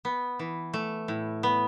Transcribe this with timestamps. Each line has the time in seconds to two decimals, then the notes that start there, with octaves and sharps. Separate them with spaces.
0.05 B3
0.39 E3
0.74 A3
1.08 A2
1.43 B3